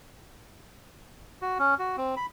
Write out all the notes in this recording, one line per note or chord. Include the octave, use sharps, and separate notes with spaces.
F#4
C#4
F#4
C4
B5